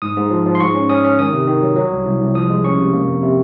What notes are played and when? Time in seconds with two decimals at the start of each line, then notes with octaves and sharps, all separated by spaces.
0.02 G#2 D#6
0.17 G#2
0.30 F3
0.46 F3
0.55 C6
0.60 G#2 C#6
0.74 C#4
0.89 C#4 D#6
1.04 C#4
1.19 D#3 D#6
1.33 C3
1.47 D#3
1.62 F#3
1.76 F#3
1.91 C2
2.05 C2
2.21 C2
2.34 F3 D#6
2.50 G#3
2.64 C#4 C#6
2.78 C3
2.93 A#3
3.07 F2
3.23 C3